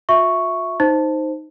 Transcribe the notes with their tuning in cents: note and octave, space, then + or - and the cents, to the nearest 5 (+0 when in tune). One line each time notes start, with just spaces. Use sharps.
F4 +45 E5 +0 C#6 +0
D#4 +0 C5 +0